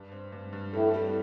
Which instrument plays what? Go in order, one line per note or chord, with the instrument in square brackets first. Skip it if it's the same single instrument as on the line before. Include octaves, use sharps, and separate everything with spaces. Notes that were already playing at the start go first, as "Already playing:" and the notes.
Already playing: [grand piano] G2
C4
G2
G2
[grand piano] F2 [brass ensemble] A2
[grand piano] G3